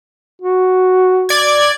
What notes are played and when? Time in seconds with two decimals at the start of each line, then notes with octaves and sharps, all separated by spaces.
0.42 F#4
1.29 D5 G#6